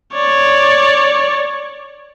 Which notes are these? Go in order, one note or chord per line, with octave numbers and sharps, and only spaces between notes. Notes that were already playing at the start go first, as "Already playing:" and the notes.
C#5 D5